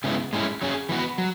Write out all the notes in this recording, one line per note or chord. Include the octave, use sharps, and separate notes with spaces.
C#3 G#3 B3 E4
A2 G#3 C#4 E4
F#3 C#4 G#4
E3 B3 F#4 B4
F#3